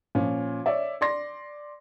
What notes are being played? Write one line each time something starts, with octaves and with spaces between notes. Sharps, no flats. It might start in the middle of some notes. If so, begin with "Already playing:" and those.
A#2 F3 C#4
C#5 D5 E5
D5 C6 A#6